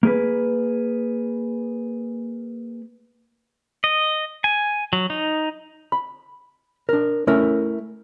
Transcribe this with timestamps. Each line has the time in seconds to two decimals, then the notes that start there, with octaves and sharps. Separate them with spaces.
0.03 A#3 G#4 B4
3.84 D#5
4.44 G#5
4.93 F#3
5.10 D#4
5.92 B5
6.89 D4 A#4
7.27 A3 C#4 E4 A#4 E5